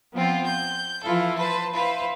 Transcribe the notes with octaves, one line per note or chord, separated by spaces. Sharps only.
F3 B3 C4 F4
G6
E3 F3 E4 F4 A4
B4 C5 A5
E4 B4 C5 F5